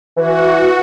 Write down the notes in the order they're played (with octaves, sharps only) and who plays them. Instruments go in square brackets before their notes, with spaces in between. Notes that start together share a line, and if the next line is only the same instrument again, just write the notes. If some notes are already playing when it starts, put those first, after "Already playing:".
[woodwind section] E3 [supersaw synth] F#4